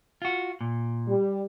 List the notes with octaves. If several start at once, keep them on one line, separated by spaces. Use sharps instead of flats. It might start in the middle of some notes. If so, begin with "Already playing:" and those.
F4 F#4
A#2
G3